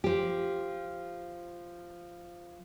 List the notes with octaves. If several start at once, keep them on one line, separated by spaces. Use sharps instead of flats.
F3 G4